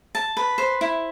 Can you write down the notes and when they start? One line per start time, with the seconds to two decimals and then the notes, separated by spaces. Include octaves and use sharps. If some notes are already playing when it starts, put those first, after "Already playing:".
0.15 A5
0.37 B4
0.58 C5
0.81 E4